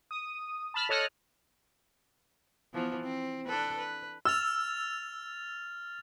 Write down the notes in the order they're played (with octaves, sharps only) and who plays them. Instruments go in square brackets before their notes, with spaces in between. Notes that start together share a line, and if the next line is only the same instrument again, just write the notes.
[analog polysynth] D#6
A5 B5 F6
A4 C#5 D#5 D#6 F6 F#6
[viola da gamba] E3 F3 B3
C4
D4 A4 B4
B4
[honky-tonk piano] E6 [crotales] F6 A6 F7